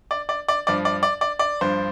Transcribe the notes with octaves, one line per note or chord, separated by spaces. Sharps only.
D5
D5
D5
G2 F3 D5
D5
D5
D5
D5
G2 F3 C5